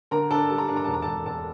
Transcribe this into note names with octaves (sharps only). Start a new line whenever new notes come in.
D3 A#4 A#5
D4 A4 A5
G3 A5
A#5
D4 A5
A#5
E1 A5
A#5
E1 A4 A5
E1 A4 A5